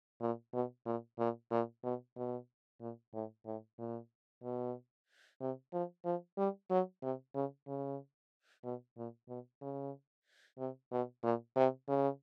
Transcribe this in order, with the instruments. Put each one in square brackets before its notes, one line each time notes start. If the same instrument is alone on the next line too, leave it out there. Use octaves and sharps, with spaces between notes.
[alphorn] A#2
B2
A#2
A#2
A#2
B2
B2
A#2
A2
A2
A#2
B2
C3
F3
F3
G3
F#3
C3
C#3
C#3
B2
A#2
B2
C#3
C3
B2
A#2
C3
C#3